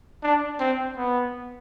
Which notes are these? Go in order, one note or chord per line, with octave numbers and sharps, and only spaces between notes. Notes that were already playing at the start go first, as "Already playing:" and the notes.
D4
C4
B3